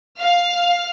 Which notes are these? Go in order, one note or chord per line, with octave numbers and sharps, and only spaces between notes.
F5